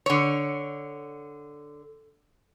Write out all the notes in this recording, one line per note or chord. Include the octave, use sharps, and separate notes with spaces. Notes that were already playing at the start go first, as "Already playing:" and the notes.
D3 C#5